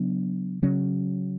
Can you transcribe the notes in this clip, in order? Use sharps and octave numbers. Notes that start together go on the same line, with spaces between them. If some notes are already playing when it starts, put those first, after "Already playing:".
Already playing: C#3 F#3 B3 D4
C#3 F#3 C#4